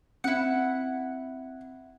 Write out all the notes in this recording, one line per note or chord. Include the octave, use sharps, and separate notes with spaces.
C4 E4 F#5